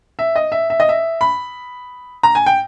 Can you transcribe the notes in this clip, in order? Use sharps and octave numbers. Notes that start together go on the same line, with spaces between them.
E5
D#5
E5
E5
D#5
E5
B5
A#5
G#5
G5